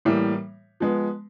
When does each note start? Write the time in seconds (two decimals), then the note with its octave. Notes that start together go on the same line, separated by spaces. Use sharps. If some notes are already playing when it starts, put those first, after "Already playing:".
0.05 A2 E3 G3 A#3
0.80 F3 G#3 B3